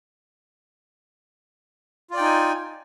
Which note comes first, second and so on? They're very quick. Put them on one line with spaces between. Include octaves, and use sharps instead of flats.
F4 D5 G5 D#4 G#5